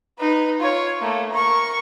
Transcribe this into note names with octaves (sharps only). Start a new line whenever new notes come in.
D#4 B4
F4 C#5
A3 A#3
A#4 C#6